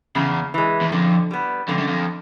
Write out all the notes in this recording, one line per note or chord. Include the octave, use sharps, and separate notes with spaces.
E2 C#3
E3 G#3
E2
F2 D3
G3 B3
F2 D3
F#2
F2